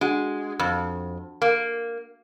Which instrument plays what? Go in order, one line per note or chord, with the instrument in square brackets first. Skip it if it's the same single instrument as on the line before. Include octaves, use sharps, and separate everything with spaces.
[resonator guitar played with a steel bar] G#3 [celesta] D4 F#4 F#5
[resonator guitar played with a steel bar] F2
A#3